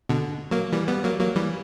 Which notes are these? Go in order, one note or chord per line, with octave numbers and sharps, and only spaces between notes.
B2 D3
F#3 A#3
E3 G3
G3 B3
F#3 A#3
F#3 A#3
E3 G3